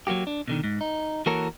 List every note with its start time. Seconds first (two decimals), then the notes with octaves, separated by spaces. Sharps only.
0.07 F#3 G#3 A#3 F#4 G4
0.27 D4
0.48 B2 D3 D#3
0.64 G#2
0.81 D#4
1.26 E3 A#3 F#4 A4 A#4 C#5